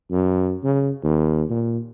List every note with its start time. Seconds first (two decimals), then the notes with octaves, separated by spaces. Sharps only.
0.11 F#2
0.63 C#3
1.04 D#2
1.49 A#2